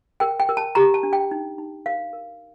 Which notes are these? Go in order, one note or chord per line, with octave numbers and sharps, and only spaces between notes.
A#4 G5
G5
A#4
A5
G4 A#5
A5
D4
G5
D#4
D#4
A#4 F5
A#4